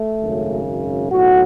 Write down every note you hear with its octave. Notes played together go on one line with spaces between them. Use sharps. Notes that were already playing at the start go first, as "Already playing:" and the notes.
Already playing: A3
G#1 F#2 C#3
B1 A2 F#4